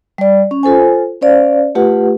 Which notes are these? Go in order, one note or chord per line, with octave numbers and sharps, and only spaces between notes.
G3 D5
C#4
F4 A4 C5 G#5
C#4 C5 D5 F5
A3 F4 G4 B4 F#5